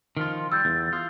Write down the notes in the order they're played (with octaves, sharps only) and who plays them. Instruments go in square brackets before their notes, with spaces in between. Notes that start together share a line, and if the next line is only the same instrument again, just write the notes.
[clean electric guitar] D#3 F3 F4 [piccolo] F6
[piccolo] C6
[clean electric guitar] G3 [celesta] E6 G6 [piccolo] A6
[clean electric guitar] E2
[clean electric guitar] F4 [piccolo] D#6